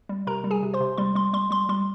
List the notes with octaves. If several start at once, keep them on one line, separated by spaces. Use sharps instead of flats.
G3
C3 A#4 A#5
G3
G#4 G#5
C3
C5 C6
C3
G3 C6
G3 C6
G3 C6
G3 C6
G3 C6